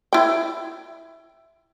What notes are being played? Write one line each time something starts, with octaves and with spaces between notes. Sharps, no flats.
E4 G5